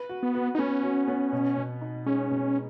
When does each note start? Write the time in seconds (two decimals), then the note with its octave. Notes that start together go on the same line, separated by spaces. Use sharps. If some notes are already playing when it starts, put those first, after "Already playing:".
Already playing: B4
0.09 F#4
0.23 B3
0.35 F#4
0.55 D#4
0.58 B3 C#4
0.83 F#4
1.08 B3
1.32 B2
1.56 B2
1.81 D#4
2.06 G#3 C#4
2.30 B2